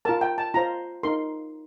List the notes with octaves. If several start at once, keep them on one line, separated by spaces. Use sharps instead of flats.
F4 A#4 A5
G5
A5
F4 C5 A#5
D#4 A#4 C6